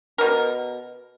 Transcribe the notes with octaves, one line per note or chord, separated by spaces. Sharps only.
B2 A#4